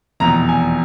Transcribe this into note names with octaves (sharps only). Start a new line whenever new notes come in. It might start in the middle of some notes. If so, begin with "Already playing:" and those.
F1 E2 B2 A#5
G#5